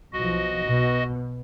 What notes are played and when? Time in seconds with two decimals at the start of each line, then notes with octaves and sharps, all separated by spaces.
0.13 B1 F3 F#4 D#5
0.65 B2